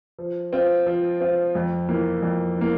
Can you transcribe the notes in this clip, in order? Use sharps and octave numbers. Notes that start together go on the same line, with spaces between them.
F3
C4 F4
F3
C4 F4
F2
E3 A#3
F2
E3 A#3